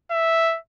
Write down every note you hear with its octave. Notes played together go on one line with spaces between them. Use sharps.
E5